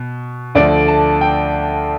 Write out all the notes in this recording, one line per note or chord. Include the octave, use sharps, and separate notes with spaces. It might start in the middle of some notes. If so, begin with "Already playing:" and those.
Already playing: B2
D2 D3 F3 A3 D5
A5
G5